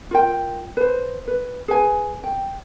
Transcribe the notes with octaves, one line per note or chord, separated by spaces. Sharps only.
F4 A#4 G5
B4 C5
B4
G#4 B4 G#5
G5